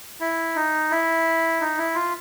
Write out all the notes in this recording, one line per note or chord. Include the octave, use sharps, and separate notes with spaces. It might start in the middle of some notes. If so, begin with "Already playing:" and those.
E4
D#4
E4
D#4
E4
F4